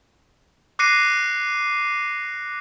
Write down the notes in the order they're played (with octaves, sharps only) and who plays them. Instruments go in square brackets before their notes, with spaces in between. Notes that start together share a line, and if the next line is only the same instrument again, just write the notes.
[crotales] D6 F#6 A#6 C7 C#7 D#7